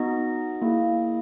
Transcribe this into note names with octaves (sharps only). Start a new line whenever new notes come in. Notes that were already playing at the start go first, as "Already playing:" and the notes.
Already playing: B3 D#4 F#4 D#5
A#3 E4 G#4